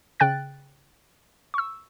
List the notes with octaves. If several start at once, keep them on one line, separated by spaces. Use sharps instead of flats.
C#3 G5 F#6 A6
C#6 E6